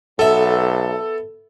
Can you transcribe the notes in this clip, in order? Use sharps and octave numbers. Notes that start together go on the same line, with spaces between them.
B1 B3 A4 E5